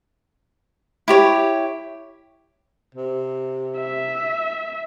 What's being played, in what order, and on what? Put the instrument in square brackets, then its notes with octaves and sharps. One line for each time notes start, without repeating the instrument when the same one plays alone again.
[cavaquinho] E4 G4 C#5
[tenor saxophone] C3
[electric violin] E5